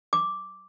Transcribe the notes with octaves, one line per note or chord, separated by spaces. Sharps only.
D6